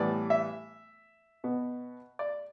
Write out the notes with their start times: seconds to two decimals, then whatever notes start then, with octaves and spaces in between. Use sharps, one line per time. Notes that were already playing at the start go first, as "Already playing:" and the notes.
Already playing: A2 E3 G3 B3 D5
0.30 E5
1.44 B2 B3
2.19 D5